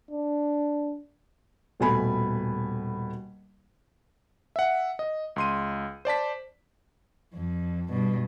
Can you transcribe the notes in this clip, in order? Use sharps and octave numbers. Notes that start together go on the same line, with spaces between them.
D4
D#1 B2 A3 G#5 B5
E5 F#5
D#5
C#2 C6 D#7
C5 D5 A5 B6
F2
G2 B2